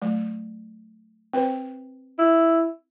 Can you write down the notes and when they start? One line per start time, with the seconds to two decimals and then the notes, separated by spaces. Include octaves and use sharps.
0.02 F#3 A3
1.34 C4 B4 C5
2.19 E4